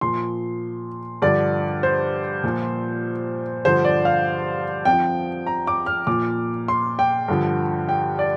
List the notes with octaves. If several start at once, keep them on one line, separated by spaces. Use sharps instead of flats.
A#2 F3 C6
G2 D3 F3 D5
C5
A#2 F3
G2 D3 F3 C5
D5
F5
F2 G5
F3
A#5
D6
F6
A#2 F3 D6
C6
G5
G2 D3 F3
G5
D5